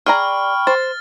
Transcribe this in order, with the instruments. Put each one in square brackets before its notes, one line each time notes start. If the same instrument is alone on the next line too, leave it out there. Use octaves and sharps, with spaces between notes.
[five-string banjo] G#4 D5 A#5 [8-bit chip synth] G5 B5 C#6 [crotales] F6
[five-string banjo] C5 [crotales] A6